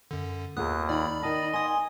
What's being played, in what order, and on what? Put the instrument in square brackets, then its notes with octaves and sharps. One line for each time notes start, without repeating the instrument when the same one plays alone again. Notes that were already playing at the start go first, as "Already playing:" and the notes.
[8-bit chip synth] F#2 D3
[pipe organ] D#2 [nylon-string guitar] B3 F4 G#4 [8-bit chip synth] D#6 F#6
[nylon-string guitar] D#3 [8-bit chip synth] D5 B5
[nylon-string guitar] D#3 A5 [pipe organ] D#5
[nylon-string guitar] B3 [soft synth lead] G#5 [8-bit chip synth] C6 D#6